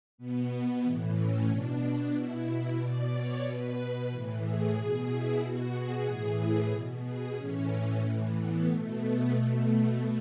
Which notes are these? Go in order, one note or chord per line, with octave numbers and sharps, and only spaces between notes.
B2 B3
A2 E3
C#4
B2 D4
D4
B2 E4
E4
B2 D5
C#5
B2 B4
A2 E3
G#4
B2 G#4
E4
B2 F#4
G#4
A2 E3
B2
G#4
A2 E3 C#4
A2 E3
B3
B2 A3
B3
B2 A3
A3